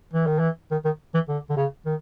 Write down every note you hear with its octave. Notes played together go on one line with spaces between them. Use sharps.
E3
D#3
E3
D#3
D#3
E3
D3
D3
C#3
D#3